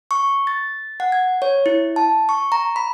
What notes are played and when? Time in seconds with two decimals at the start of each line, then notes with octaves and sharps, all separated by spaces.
0.11 C#6
0.47 A6
1.00 F#5
1.12 G#6
1.42 C#5
1.66 E4
1.96 A5
2.29 C#6
2.52 A#5
2.76 B5